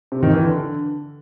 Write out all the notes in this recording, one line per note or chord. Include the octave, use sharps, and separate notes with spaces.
C3
D#3
E3
D3